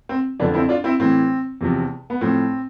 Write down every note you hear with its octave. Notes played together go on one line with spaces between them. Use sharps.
C4
F2 D3 F3 B3 D4
C4 E4
D4 F4
C4 E4
A2 E3 C4
E2 C3 F3
B3
A2 F3 C4